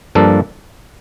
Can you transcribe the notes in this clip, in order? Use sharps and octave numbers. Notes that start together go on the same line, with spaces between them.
G2 F3 A#3 D4 A4